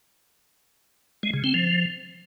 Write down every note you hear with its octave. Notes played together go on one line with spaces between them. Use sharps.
G#3
C#3
C4
F3